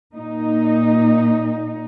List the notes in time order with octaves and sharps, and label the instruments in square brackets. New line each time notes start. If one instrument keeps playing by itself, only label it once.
[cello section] A#2 D#4